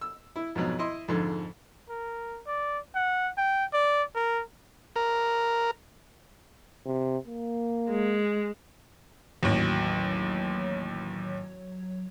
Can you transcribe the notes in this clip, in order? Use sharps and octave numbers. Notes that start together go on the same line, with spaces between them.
E6
E4
F2 G#2 B2 F#3
E4 D#5 C6
F2 G#2 D3
A#4
D5
F#5
G5
D5
A#4
A#4
C3
A#3
G#3
A1 D#2 F#3 C#5